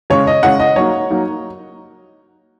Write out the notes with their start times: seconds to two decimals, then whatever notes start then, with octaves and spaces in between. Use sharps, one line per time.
0.10 C#3 G#3 C#4 C#5
0.27 D#5
0.43 C#3 G#3 C#4 F#5
0.60 D#5
0.76 F#3 A#3 D#4 C#5
1.10 F#3 A#3 D#4